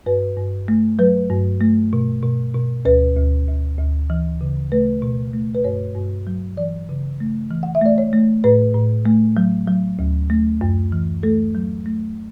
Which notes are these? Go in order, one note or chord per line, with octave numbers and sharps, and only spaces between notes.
G2 B4
G2
A3
F#3 B4
G2
A3
B2
B2
B2
D2 B4
D2
D2
D2
E3
C#3
A3 B4
B2
A3
B4
G2 C#5
G2
F#3
E3 D5
C#3
A3
E3
F#5
E5
A3 D5
C#5
A3
A2 B4
A2
A3
F#3
F#3
D2
A3
F#2
E3
A3 A4
F#3
A3